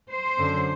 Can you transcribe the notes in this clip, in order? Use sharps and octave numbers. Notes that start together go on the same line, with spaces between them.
C5
F#2 D3